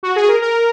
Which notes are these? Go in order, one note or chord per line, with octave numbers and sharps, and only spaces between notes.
F#4
G#4
A#4
A#4